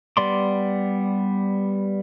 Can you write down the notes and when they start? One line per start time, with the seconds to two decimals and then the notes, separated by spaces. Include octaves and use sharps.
0.17 G3 B3 D5 C6 D6